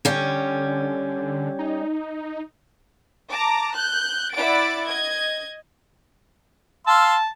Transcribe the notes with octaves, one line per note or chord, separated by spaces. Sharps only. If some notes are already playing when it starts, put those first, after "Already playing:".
D3 G3 C#4
D#4
A5 A#5 D6
F#6 G6
E4 D5 F#5 A6 D7
D#5 G#6
F5 A5 C6 E6